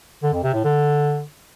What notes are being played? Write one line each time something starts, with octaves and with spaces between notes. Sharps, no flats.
D3
F2
C3
A2
D3